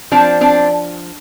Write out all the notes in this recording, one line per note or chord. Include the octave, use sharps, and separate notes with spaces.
F3 C4 D4
C4 D4